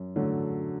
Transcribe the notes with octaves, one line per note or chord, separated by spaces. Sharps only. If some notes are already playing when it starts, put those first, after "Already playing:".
Already playing: F#2
D3 F#3 A3